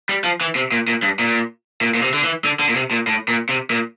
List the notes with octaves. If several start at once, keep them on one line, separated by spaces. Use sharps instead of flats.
G3
F3
E3
C3
A#2
A#2
G2
A#2
A#2
A#2
C3
D3
E3
D3
D3
A#2
C3
A#2
A2
A#2
C3
A#2